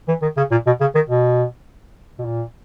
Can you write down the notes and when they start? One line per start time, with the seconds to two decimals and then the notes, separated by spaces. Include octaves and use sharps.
0.08 E3
0.22 D#3
0.37 C#3
0.52 A#2
0.66 B2
0.81 C#3
0.95 D#3
1.09 B2
2.19 B2
2.25 A#2